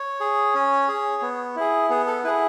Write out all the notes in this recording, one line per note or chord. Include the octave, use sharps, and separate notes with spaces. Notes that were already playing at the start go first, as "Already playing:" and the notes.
Already playing: C#5
G#4
C#4
G#4
B3
E4 G#4
B3 G#4
A4
E4 G#4 B4